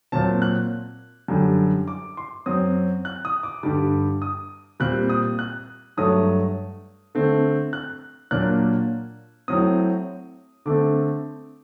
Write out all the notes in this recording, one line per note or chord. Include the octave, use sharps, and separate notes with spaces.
A#2 F#3 C4 A5
F#6
F#2 D3 G3
D6
C6
F#2 F#3 C4 D#6
F#6
D#6
D6
G2 D3 G3 D6
D#6
A#2 G3 C4 F#6
D#6
F#6
G2 F#3 A3 D#6
D3 A3 C4
F#6
A#2 F#3 A#3 D4 F#6
A2 F#3 C4 D#6
D3 A3 C4 D6